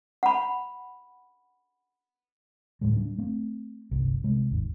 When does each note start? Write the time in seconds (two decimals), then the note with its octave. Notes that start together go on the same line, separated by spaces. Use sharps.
0.23 F#5 B5
2.81 D2 A2 F#3 G#3
2.96 G3 D4
3.18 A3 C4
3.91 G1 C2
4.24 C3 G#3
4.51 G#1 D#2